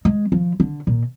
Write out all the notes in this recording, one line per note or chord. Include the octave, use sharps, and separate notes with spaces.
G#3
F3
D3
A#2